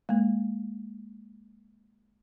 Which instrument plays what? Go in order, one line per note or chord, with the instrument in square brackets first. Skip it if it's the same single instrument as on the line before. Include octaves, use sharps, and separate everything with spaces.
[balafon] G#3 A#3